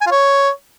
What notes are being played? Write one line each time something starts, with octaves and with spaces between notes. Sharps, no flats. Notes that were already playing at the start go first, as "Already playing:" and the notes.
G#5
F4
C#5